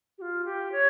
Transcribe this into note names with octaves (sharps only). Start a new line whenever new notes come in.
G4
F4
G4
C#5